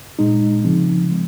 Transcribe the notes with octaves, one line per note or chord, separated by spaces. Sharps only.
A#2 G#3 D#4
C#3 F3 C4
F3 G#3